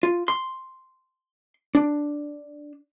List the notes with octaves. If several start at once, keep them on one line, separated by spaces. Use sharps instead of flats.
F4
C6
D4